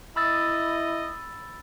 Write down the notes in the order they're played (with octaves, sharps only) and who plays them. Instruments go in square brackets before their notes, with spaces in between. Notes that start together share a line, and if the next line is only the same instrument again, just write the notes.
[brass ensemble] E4 D#5 [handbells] B5 E6 A6